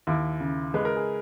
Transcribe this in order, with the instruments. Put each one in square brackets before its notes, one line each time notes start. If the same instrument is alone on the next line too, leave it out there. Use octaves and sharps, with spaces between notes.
[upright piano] D#2 [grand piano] E4
[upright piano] C#3
[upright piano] G#3 [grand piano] B4
[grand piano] A#4
G#4